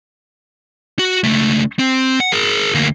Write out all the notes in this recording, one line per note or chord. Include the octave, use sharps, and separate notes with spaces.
F#4
C#2 A3
C4
F#5
G#4 A#4
D2 A#3